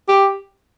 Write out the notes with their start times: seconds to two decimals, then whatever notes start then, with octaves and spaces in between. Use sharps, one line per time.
0.09 G4